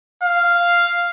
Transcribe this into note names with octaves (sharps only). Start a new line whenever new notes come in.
F5